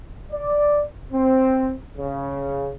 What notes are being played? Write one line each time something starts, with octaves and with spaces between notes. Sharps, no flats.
D5
C4
C#3